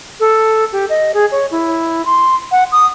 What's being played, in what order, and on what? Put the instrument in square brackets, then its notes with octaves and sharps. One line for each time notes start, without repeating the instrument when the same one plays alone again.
[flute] A4
G4
D#5
G#4
C#5
E4
C6
F#5
D#6